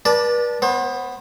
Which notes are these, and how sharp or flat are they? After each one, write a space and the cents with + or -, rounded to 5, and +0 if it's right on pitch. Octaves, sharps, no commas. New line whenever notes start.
B4 -40 D5 +5 A5 -10
B3 +5 C5 +35